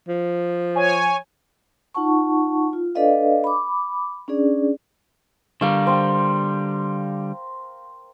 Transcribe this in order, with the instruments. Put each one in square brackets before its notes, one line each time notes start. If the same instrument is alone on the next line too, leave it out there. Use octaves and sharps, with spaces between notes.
[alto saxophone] F3
[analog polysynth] C#5 G#5
[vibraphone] D#4 F4 F#5 A5 C#6
F4
D4 A4 B4 D5 D#5 F5
B5 D6
C#4 D4 G#4 D5
[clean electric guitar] D3 G3 [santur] A#4 F5 C#6
[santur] C5 G5